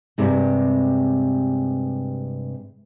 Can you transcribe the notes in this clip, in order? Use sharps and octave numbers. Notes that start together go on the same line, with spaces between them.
G2 C3 G#3